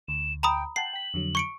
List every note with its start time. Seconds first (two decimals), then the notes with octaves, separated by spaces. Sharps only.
0.08 D2 E7
0.43 G5 A#5 B5 D#6
0.76 F#5 G5 A5 C7 F#7
0.93 G5 B6
1.14 F2 D3 F#3
1.35 C#6 C#7 D7